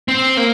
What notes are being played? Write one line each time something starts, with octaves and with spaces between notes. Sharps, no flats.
C4
A#3